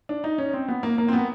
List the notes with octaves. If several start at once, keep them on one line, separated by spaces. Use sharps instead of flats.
D4
D#4
C#4
C4
B3
A#3
A#3
C4
B3